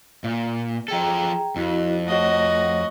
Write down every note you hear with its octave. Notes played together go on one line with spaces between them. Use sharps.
A#2
F3 G#4 A4 G5 A#5
F2 E4 F#4
A3 F#4 C#5 D#5 F#5